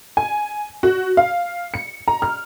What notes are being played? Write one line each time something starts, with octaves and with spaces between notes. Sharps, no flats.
G#5
F#4
F5
C#7
A#5
F6